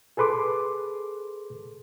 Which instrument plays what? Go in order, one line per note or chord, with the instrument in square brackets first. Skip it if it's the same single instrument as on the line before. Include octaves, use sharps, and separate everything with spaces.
[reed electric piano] G#4 A4 B4 C6 D6